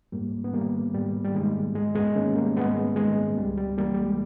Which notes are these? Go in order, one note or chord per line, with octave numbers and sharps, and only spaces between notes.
G#2 G3 A#3
B3
D#3 G3 A#3
G#2 G3
G3
D#3 G#3
G#2 G#3
G#3 B3
D#3 A#3 C#4
G3 A#3
G#2 G#3 B3
D#3 G#3
C#2 G3
G3
C#3 E3 G3 A#3
G3
G#3